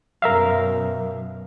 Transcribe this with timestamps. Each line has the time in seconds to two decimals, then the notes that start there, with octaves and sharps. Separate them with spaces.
0.22 F#2 B2 A#4 E5 F5